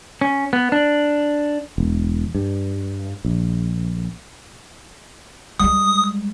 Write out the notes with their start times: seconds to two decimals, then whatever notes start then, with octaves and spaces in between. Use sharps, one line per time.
0.21 C#4
0.53 B3
0.72 D4
1.78 E1
2.35 G2
3.25 A#1
5.60 G3 G#3 D#6